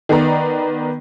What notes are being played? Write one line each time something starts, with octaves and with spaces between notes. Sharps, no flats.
D#3 B3 D5 A#5